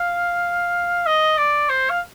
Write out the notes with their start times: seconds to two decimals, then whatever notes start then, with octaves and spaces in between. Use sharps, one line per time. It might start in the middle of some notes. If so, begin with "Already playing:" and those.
Already playing: F5
1.06 D#5
1.38 D5
1.69 C5
1.90 F5